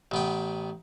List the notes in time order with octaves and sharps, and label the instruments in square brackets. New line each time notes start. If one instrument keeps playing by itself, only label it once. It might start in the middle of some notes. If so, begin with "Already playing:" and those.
[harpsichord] A1 B3 G5